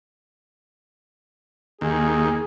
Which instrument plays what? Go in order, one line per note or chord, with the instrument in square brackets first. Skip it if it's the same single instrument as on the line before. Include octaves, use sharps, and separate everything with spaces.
[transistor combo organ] D#2 [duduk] G#4